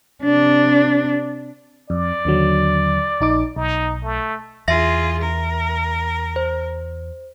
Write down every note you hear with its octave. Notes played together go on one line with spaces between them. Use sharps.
C3 D4
F2 D5
D#2 D3 F#3
A#1 D#4 D6
B1 D#4
A3
E2 F4 G#4 E5 A#6
A#4
C5